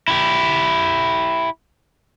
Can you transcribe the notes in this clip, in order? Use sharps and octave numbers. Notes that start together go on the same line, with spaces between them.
E4 G4